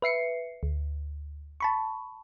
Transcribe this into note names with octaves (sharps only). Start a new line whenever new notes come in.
B4 E5 C7 C#7
D2
A5 B5 C#6